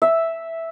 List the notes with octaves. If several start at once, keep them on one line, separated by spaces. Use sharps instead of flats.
E5